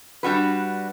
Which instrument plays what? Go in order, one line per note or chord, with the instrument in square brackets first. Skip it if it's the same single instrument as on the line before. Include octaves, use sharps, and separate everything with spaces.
[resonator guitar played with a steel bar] G3 D4 F#4 B4